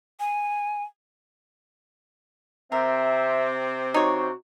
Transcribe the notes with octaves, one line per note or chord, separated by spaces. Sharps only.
G#5
C3 C4 A#4 E5
D#4 F#4 C#5